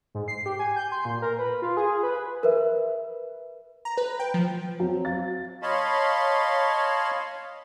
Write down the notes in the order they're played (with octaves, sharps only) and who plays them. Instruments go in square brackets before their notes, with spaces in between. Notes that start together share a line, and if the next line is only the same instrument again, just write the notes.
[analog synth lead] G#2
C7
G4
G#5
G6
C6
A#2
A#4
B4
F4
G#4
B4
[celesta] A#4 B4 E5
[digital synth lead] A#5
B4
G5
F3
[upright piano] F#3 C4
F5 A6
[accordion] C#5 D#5 F5 A5 B5 C6